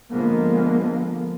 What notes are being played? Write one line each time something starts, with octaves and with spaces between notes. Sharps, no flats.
D3 F3 G#3 A#3 B3